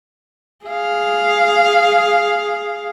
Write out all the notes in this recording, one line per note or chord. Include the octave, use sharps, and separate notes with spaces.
G#4 F5